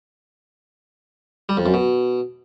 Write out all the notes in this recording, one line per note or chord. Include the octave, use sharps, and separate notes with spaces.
G3
F2
F#2
B2